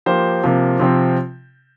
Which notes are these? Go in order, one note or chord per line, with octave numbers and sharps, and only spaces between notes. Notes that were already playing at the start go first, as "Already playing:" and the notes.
F3 A#3 G4 C5
C3 F3 A#3
C3 F3 C4